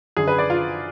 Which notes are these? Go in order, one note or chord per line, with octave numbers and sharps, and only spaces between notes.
F#2 D3 G#4
B4
D5
F4